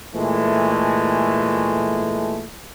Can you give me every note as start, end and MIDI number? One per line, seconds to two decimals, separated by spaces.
0.16 2.46 46
0.16 2.46 52
0.16 2.46 56
0.16 2.46 57